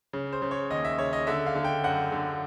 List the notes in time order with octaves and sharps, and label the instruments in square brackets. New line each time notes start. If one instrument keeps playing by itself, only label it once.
[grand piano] C#3
C5
C#3
C#5
D#2 D#5
E5
C#3 C#5
D#5
D3 E5
F5
D3
G5
F#2 F#5
D3